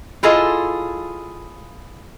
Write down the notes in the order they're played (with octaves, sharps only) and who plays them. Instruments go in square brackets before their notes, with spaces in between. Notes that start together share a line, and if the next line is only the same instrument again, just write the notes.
[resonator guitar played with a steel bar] E4 F4 G#4 A4 D#5